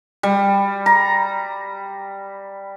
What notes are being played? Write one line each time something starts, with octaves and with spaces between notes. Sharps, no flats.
G3
A#5